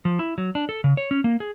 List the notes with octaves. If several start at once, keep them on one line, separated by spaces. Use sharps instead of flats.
F3
E4
F#3
D4
A4
C#3
C#5
C#4
A#3
G#4